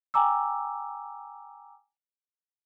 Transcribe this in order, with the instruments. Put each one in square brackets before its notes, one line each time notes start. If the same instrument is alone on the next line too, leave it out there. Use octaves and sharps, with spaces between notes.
[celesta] G5 G#5 A#5 D6 E6